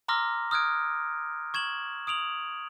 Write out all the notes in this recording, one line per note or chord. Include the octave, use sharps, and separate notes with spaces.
A#5 C6 D6 E6 F6 A#6
D#6 F6 F#6 G#6 D7
C#6 G#6 E7 F#7
D#6 D7 F7 F#7